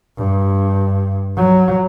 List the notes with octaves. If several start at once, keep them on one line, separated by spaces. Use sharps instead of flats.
G2
F#3